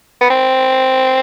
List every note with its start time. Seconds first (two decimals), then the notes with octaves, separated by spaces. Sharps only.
0.21 B3
0.30 C4